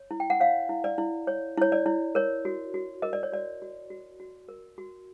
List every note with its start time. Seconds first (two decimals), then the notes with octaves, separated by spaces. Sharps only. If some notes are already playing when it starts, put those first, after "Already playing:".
Already playing: C#5
0.11 E4
0.20 G5
0.30 F#5
0.40 C#5 F5
0.69 E4
0.84 D5
0.98 E4
1.27 C#5
1.57 E4 C#5
1.72 D5
1.86 E4
2.15 A#4 C#5
2.45 F#4
2.74 F#4
3.02 A#4 D#5
3.13 D5
3.23 C#5
3.33 F#4 D5
3.62 F#4
3.90 F#4
4.20 F#4
4.49 A#4
4.78 F#4